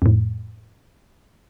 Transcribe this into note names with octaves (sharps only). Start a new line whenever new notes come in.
F2 A2